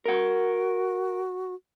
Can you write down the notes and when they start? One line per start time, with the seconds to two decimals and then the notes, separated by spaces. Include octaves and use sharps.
0.06 F#4 A#4 F#5